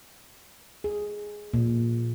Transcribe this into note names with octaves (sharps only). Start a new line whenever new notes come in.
G#4
A#2